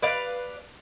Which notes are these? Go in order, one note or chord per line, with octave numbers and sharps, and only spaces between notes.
B4 D5 F5